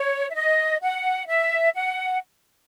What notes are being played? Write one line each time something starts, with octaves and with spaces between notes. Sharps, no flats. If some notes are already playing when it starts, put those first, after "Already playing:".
Already playing: C#5
E5
D#5
F#5
E5
F#5